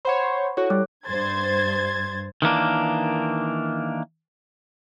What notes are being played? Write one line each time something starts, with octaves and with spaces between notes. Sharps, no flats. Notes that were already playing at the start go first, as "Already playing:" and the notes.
C5 C#5 F#5 B5
E4 F#4 A4 C#5
G3 D6 F#6
G2 C5 G#6 A6
D#3 E3 A#3 D4